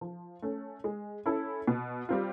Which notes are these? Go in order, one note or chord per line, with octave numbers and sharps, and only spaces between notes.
F3
A3 C#4
G#3
C#4 E4 A4
B2
G3 C4 F4